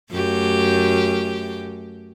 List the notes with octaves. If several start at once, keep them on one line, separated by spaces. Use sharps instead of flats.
F#2 A3 G4